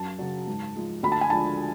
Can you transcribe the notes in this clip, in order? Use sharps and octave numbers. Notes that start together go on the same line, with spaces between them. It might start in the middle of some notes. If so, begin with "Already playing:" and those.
Already playing: F#2 A5
C#3 F#3
G#2
F3 G#3
D2 B5
A5
G#5
D3 F3 G#3 A5